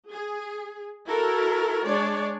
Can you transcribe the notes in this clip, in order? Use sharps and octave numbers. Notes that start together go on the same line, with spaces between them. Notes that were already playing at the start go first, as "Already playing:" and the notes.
G#4
E4 F#4 A4 A#4
G#3 D4 C#5 D5